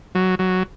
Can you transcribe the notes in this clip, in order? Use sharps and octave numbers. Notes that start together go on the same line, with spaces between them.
F#3
F#3